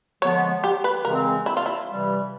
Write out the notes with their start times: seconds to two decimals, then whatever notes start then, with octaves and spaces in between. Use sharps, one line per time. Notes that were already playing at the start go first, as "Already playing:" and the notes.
0.22 D3 F3 G#3 B3 C#5
0.64 G4
0.84 B4
1.05 C#3 E3 G#3 C4 A#4
1.46 E4
1.57 F4
1.66 E4
1.88 C3 E3 G3